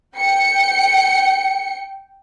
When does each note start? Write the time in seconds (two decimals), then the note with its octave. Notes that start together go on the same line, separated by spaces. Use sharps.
0.17 G5 C#7